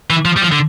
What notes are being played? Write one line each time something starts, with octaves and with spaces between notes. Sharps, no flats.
E3
F3
G3
F3
D3